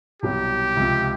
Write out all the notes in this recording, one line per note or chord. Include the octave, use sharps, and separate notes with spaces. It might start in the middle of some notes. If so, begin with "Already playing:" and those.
C2 B2 F#3 G4
C#2 C3 F3